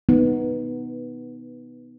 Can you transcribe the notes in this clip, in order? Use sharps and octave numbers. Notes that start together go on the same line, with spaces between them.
B3 D#4